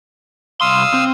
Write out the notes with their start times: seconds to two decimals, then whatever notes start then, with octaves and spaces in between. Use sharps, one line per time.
0.61 C2 F5 C6 D#6 E6
0.94 C4